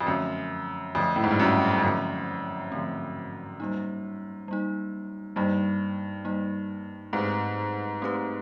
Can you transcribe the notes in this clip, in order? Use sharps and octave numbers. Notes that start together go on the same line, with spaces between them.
F2
F#2 D3 F3 A3 C4
F2 D3 F3 A3 C4
A2
G#2
G2
F#2
F2
F#2 D3 F3 A3 C4
D3 F3 A3 C4
G3 A#3 D#4
G3 A#3 D#4
G2 G3 A#3 D#4
G3 A#3 D#4
G#2 A3 C4 D#4 G4 B4
A3 C4 D#4 G4 B4